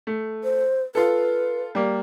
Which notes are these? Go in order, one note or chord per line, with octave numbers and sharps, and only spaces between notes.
A3
C5
F4 A4 B4
G3 A#3